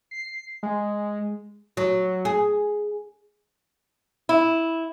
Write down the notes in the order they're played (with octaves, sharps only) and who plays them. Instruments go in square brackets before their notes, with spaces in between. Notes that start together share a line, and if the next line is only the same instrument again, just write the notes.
[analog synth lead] C7
G#3
[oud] F#3
G#4
[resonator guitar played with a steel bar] E4